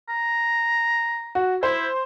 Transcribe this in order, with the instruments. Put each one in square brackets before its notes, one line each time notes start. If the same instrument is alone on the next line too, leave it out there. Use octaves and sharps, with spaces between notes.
[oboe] A#5
[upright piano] F#4
[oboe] E4 [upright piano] C5